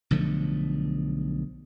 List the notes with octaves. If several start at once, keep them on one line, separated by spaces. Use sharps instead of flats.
B1 D3 F3 A3